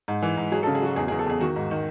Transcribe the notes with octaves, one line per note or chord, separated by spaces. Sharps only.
G#2
E3
G#2
F#3 G#4
A4
C#3
G#4
F#3 F#4
E2 G#4
G#4
E2
A4
E2 G#4
D#3 F#4
G#2
D#3